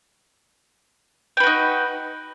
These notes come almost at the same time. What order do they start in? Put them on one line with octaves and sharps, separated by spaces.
G5 B4 F#4 D#4